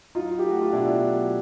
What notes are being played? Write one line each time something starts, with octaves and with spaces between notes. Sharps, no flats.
F#3 D#4 F4
G4
A3
F#4
F4
B2 D4 E4
F#3